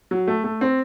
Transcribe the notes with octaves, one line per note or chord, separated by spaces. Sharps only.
F#3
A3
A3
C4